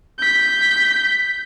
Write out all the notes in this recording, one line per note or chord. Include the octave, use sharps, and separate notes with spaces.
G6 B6